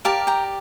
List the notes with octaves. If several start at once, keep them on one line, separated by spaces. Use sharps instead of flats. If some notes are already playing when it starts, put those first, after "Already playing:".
G4 A#4 D5 F5 A5
G5 A#5